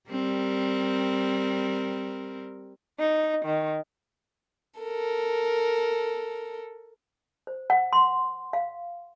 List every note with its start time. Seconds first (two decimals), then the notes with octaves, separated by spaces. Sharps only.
0.10 G3 C4 A#4
3.00 D#4
3.45 D#3
4.81 A4 A#4
7.47 C5
7.70 F#5
7.93 C6
8.53 F5